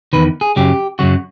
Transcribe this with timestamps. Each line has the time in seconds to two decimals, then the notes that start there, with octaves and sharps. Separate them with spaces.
0.13 E2 C3 D#3 B4
0.41 G#4
0.56 F#2 C#3 F#3 G4
0.99 F#2 C#3 F#3 F#4